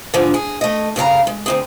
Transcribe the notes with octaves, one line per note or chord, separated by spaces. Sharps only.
G#2 D3 F3 G#3 D4
G#4
A3 D#5
G2 C#3 F5 A#5
G#3
D2 C4 G#4